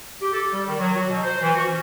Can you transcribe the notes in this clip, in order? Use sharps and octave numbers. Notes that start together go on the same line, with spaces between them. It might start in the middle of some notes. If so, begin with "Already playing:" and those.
G4
A4
G3
D#3
F#3
F#4
B2
C5
E3
F#4
C#4